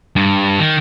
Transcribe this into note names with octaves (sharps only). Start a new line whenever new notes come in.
G2
D#3